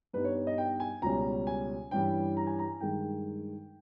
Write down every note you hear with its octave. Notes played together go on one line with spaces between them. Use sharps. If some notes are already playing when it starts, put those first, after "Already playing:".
G2 G3 B3 D#4 B4
C#5
C#5
D#5
G5
G#5
C#2 B2 G3 C#4 A#5
G#5
G2 E3 G3 C#4 E4 G5
A#5
G#5
A#5
G2 D#3 G#3 G5